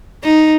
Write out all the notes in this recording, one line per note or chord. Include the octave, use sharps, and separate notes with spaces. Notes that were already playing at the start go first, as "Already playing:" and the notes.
D#4